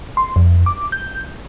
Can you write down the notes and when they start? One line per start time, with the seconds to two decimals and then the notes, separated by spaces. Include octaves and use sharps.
0.17 C6
0.36 F2
0.66 D6
0.92 G6